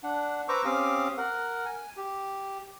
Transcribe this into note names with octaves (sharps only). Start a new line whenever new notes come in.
D4 F#5
B4 C5 A#5 C#6 D6 E6
C4 C#4 G4 F5 D6 D#6
A#4 F#5
G#5
G4